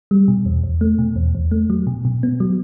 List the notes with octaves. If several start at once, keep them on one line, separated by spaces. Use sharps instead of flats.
G3
B2
E2
E2
A3
B2
E2
E2
A3
F#3
B2
B2
B3
F#3